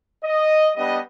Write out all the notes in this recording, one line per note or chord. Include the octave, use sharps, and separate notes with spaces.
D#5
G3 B3 D4 D#5